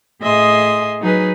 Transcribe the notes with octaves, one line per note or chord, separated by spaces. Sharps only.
A2 G#4 D#5 E5 C6 D#6
F#3 D#4 G#4 B4